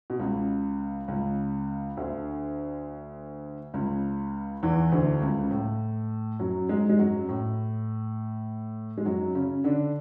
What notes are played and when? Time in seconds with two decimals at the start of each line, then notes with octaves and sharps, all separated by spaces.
0.10 B2
0.20 C#2 C#3
1.08 C#2 C#3
1.97 D2 D3
3.74 C#2 C#3
4.63 E2 E3
4.92 D2 D3
5.22 C#2 C#3
5.51 A2
6.40 F#2 F#3
6.69 G#2 G#3
6.89 G#3
6.99 F#2 F#3
7.29 A2
8.98 G#3
9.05 F#2 F#3
9.35 C#3 C#4
9.64 D3 D4